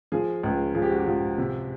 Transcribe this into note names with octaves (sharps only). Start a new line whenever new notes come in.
F3 G#4
C#2
F3 G#4
G4
F#4
G4
F3
C3